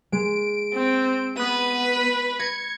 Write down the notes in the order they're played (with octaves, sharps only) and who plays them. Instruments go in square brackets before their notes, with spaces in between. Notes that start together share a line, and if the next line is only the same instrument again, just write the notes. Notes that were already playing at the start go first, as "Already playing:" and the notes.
[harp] G#3 [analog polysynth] D7
[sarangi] C4
[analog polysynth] B3 D#7 [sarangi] B4
[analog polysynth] G#6 C#7 [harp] A#6